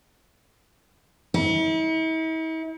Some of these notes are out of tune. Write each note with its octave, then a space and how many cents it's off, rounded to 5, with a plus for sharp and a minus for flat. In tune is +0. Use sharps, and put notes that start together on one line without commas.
E4 -45